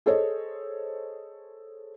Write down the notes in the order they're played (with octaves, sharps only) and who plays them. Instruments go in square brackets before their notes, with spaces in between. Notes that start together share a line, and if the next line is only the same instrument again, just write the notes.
[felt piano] G#4 A4 C5 C#5 D#5